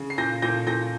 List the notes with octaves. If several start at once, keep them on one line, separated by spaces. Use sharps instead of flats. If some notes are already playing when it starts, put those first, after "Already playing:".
Already playing: C#3
C7
A#2 G6 A#6
A#2 G6 A#6
A#2 G6 A#6